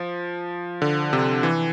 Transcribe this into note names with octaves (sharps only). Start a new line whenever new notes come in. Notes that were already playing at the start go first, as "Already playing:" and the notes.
Already playing: F3
D3
C3
E3